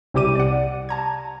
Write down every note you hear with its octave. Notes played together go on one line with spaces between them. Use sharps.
C2 C3 G3 G4 D6 D#7
D5 F#5
A5 A#5 G#6